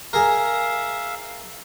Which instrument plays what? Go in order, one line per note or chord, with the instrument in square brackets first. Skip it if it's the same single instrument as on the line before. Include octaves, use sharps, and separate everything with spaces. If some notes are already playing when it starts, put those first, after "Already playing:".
[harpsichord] G#4 A#4 [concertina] E5 F5